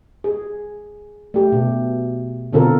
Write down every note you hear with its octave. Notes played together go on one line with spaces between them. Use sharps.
G#4
A3 G4
B2
B2 D3 C4 F4 A4 A#4